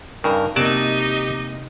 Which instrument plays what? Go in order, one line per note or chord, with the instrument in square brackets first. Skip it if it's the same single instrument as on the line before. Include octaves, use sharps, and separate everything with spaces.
[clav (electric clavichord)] G2 C#3 [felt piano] D#4 [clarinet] A#4
[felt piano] C3 A#3 [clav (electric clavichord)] F#3 D5 A5 [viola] D#4 D#5 [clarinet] G4